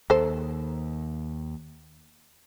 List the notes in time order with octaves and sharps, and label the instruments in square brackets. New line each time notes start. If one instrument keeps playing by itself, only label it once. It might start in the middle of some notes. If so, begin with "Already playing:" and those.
[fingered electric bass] D#2 [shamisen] A4 C5